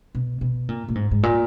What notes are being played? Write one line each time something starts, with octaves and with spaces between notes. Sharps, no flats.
B2
B2
A#2
A#2
G#2
G#2
A#2